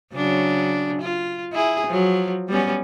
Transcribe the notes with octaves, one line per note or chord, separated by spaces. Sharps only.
C#3 F#3 D4
F4
E4 G#4
F3 F#3
G3 B3 C#4